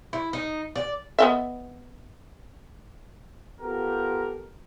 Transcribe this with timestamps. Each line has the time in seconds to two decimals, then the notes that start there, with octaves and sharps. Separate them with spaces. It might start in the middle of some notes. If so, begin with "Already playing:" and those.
0.13 E4
0.33 D#4
0.76 D5
1.19 B3 D#5 E5
3.61 B3 F4 G4 A4 A#4